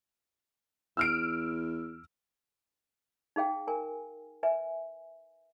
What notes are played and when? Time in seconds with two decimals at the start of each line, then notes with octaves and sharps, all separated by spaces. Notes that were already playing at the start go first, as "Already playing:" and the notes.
0.97 E2 E6 F6 D7
3.36 D#4 G#4 F5 G5
3.67 A#4 G#5
4.43 B4 E5 G#5